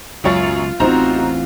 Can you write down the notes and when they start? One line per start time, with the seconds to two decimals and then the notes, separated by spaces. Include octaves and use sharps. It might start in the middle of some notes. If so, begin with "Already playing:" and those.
0.24 C#2 F#2 B2 F4 C#5 A6
0.80 A1 E2 C4 D#4 F4 F#4 C5 A#5